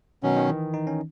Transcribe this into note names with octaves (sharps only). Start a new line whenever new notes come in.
B2 D#3 F#3 C#4
D#3
E3
D#4
C#4